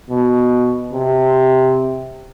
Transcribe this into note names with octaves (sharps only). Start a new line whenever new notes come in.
B2
C3